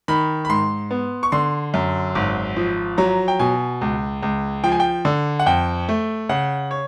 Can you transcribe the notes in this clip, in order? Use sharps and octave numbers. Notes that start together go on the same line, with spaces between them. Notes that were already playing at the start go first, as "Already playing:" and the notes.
D#3 B5
B5
G#2 C6
B3
C#6
D3 C6
F#2
G#1
F3
F#3 A#5
G5
B2 G#5
C#2
C#2
F3 G5
G#5
G5
D3
F#5
F2 G5
A3
C#3 F#5
C#5